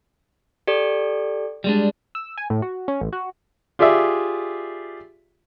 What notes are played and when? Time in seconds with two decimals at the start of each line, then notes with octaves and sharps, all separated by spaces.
0.67 G4 A4 D5
1.64 G3 G#3 D4
2.15 E6
2.37 G#5
2.50 A2
2.62 F#4
2.88 C#4
3.01 A1
3.12 F#4
3.79 F4 G4 G#4 D5 E5